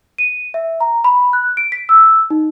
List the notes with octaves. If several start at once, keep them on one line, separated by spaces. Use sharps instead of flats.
D#7
E5
A#5
B5
F#6
D7
B6
E6
D#4